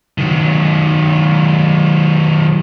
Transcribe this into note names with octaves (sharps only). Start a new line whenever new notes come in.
D#3 F#3